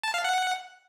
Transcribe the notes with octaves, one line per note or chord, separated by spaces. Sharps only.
A5
F5
F#5